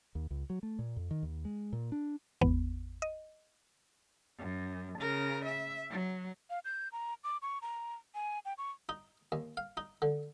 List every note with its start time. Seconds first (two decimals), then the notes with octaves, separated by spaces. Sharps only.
0.15 D#2
0.31 C#2
0.50 F#3
0.63 A3
0.79 A#2
0.96 F2
1.11 D#3
1.23 D#2
1.45 G#3
1.73 A#2
1.92 D4
2.41 G#1 E2 B3
3.02 D#5
4.39 F#2
4.99 C#3 A#4
5.45 E5
5.90 F#3
6.50 F5
6.65 G6
6.92 A#5
7.24 D6
7.42 C#6
7.62 A#5
8.15 G#5
8.45 G5
8.58 C#6
8.89 D#4
9.32 D#2
9.57 F5
9.77 D#4
10.02 D3